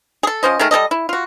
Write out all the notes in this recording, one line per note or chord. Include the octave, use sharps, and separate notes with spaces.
G#4 A4
F3 C#4 C5 D#5
D#3 G#3 A3 A#4
G3 C#4 A4 D#5
E4
F4 F#4